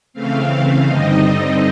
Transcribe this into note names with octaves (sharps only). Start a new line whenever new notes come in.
C#3 E3 A3 C4 F5
G2 D3 G3 C4 D#4 D#5